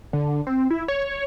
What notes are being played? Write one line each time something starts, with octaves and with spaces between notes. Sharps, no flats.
D3
C4
E4
C#5